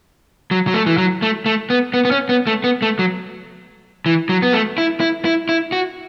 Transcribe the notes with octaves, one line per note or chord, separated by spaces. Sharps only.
F#3
F#3
A3
E3
F#3
A3
A3
B3
B3
B3
C#4
B3
A3
B3
A3
F#3
E3
F#3
B3
A3
E4
E4
E4
E4
F#4